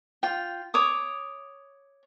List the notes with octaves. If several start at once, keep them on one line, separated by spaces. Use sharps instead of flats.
F4 G5
C#5 D6 D#6